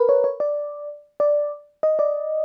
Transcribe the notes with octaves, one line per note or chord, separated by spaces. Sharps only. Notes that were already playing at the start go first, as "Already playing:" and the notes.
Already playing: A#4 B4
C#5
C#5
D5
D5
D#5
D5